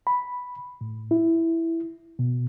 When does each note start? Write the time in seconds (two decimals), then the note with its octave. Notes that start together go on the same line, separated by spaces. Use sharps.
0.07 B5
0.81 A2
1.11 E4
2.19 B2